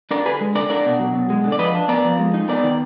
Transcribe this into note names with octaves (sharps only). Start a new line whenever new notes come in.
D4 A#4 D5
D3 G#4 B4
G#3
D3 A#4 D5
D4 A#4 D5
B2
F#3
B2
G#3
D3
D5
F3 B4 D#5
D4
B3 A#4 D5
F3
G#3
D#4
B3 A#4 D5
D#3